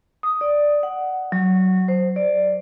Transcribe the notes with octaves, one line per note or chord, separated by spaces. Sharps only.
D#6
D5
F#5
F#3
C5
D5